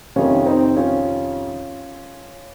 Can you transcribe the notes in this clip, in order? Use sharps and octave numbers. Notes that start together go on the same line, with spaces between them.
F2 C3 D#3 C#4 F4
C4 D#4
C#4 F4